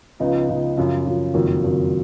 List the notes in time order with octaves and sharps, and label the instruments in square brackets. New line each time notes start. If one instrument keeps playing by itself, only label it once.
[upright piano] C#2 C#3 F3 B3 D#4
C#2 C#3 F3 B3 D#4
F#2 C#3 F3
F#2 C#3 F3
F#1 F2 D#3 F#3
F#1 F2 D#3 F#3